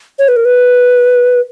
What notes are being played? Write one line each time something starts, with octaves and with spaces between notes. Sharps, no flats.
C#5
B4
A#4
B4